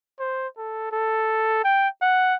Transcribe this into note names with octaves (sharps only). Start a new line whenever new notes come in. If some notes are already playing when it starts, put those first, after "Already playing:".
C5
A4
A4
G5
F#5